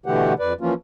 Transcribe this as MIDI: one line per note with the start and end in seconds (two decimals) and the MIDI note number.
0.06 0.33 47
0.06 0.33 50
0.06 0.33 52
0.06 0.33 57
0.06 0.33 67
0.06 0.33 78
0.39 0.53 41
0.39 0.53 71
0.39 0.53 74
0.61 0.74 52
0.61 0.74 53
0.61 0.74 58
0.61 0.74 61
0.61 0.74 65